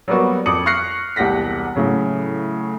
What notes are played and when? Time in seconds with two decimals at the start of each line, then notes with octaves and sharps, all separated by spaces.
0.08 F#3 G3 A#3 B3 F#4
0.46 F2 D6 D#6 C#7 F#7
0.66 C#6 F6 F#6 A#6 C7 C#7
1.16 E1 C2 G4 F#5 A#6 B6
1.76 A2 C#3 F#3